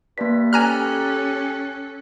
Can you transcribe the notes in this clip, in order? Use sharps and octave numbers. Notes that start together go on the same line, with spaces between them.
G2 A#3 B6
C#4 G4 A4 G#5 A#5 F6 F#6